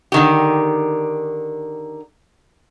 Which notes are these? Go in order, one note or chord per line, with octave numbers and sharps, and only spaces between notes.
D3 D#3 G4